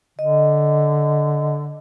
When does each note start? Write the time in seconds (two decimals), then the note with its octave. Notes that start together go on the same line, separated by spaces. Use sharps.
0.19 D3 D#5